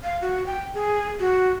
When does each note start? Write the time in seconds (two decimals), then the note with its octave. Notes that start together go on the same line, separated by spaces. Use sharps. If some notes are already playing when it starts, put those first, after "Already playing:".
0.04 F5
0.21 F#4
0.46 G5
0.74 G#4
1.20 F#4